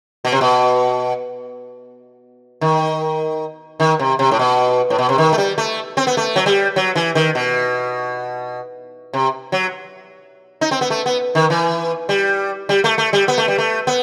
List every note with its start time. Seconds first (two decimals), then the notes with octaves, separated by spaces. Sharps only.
0.25 B2
0.32 C3
0.41 B2
2.61 D#3
3.80 D#3
3.99 C3
4.19 C3
4.31 A2
4.39 B2
4.90 A2
4.98 B2
5.09 C3
5.18 D#3
5.33 A3
5.38 G3
5.58 A3
5.97 C4
6.07 B3
6.17 A3
6.36 F#3
6.46 G3
6.76 F#3
6.96 E3
7.15 D#3
7.35 B2
9.13 C3
9.52 F#3
10.61 D#4
10.71 C4
10.81 B3
10.90 A3
11.06 B3
11.35 D#3
11.50 E3
12.09 G3
12.69 G3
12.84 A3
12.98 A3
13.13 G3
13.28 B3
13.38 A3
13.48 G3
13.58 A3
13.87 B3